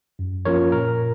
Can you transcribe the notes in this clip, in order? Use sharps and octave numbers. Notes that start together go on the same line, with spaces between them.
F#2
F3 A#3 C#4 F4 A#4 C#5
A#2 A#4